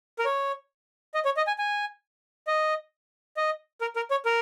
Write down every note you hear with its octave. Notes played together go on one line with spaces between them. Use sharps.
A#4
C#5
D#5
C#5
D#5
G#5
G#5
D#5
D#5
A#4
A#4
C#5
A#4